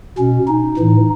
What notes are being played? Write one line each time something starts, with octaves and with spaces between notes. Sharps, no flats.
B2 C#4
D#4
A2 E3